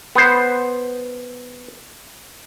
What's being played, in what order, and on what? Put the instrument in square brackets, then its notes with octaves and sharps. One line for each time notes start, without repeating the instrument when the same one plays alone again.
[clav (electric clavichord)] B3 C5